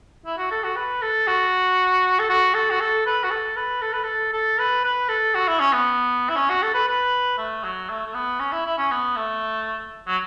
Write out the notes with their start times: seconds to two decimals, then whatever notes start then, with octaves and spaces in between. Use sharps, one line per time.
0.26 E4
0.38 F#4
0.51 A4
0.64 F#4
0.76 B4
1.02 A4
1.27 F#4
2.19 A4
2.30 F#4
2.54 A4
2.71 F#4
2.80 A4
3.06 B4
3.24 F#4
3.31 A4
3.57 B4
3.82 A4
3.93 B4
4.04 A4
4.33 A4
4.59 B4
4.84 B4
5.09 A4
5.35 F#4
5.48 E4
5.60 C#4
5.73 B3
6.29 E4
6.36 C#4
6.50 F#4
6.63 A4
6.74 B4
6.88 B4
7.38 A3
7.64 F#3
7.90 A3
8.06 A3
8.14 B3
8.40 C#4
8.52 E4
8.66 E4
8.78 C#4
8.91 B3
9.16 A3
10.08 F#3